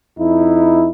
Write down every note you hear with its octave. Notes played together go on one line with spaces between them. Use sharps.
F2 D#4 E4